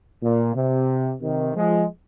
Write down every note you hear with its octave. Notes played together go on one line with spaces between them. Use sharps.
A#2
C3
C3 D#3
F3 G#3